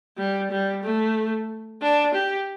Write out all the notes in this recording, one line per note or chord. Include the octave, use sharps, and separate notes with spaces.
G3
G3
A3
D4
G4